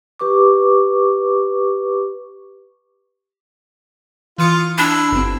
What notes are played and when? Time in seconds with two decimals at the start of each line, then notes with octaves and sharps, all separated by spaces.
0.19 G4 B4 C#6 D6
4.38 E3 F4 D#6 C#7
4.78 D4 E4
5.12 G1 C4